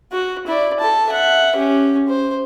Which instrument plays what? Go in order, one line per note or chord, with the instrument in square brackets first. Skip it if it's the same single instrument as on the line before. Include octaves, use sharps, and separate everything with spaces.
[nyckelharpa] F#4
E4 D5
A4 A5
E5 F#5
C#4 G4
C5